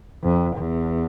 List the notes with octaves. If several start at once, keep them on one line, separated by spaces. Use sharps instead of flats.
F2
E2